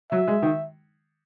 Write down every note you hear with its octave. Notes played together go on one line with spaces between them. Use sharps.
F#3 E5
G#3
D#3